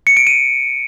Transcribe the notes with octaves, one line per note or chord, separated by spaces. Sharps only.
C#7
D7
D#7